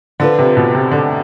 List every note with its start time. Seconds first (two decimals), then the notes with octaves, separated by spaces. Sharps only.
0.20 D3 F3 C4 F4 B4
0.39 C3
0.57 B2
0.75 C3
0.91 D3